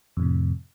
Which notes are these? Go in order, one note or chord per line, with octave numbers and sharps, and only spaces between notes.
F2 A2 C3